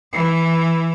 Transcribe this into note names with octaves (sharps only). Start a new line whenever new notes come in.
E3